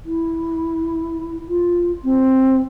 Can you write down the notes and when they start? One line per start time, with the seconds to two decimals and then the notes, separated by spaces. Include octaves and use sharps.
0.06 E4
1.49 F4
2.04 C4